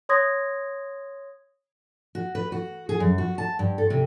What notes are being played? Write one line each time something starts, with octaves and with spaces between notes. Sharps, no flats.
C#5 C6 D#6 G#6 A#6
F#4
B4
F#4
G#4
F#2
F#4
A5
G2
A4
C3